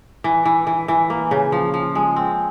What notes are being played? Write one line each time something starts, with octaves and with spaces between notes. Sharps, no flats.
E3
E3
E3
E3
A#3
C#3
F3
F3
G#3
C4